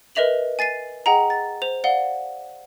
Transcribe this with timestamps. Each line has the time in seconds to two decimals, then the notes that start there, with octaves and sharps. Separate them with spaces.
0.15 A#4 B4 D#5 E5 F7 F#7
0.59 G#5 A6 C7 D#7
1.06 G#4 D#5 F#5 G5 A#5
1.30 A6
1.62 C5 F7
1.84 D5 F5 F#5 G7